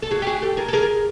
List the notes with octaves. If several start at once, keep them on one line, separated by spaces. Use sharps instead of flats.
A4
F#4 G#4
G4
F#4 G#4
G4 A4
G#4 A#4
A4
G#4 A#4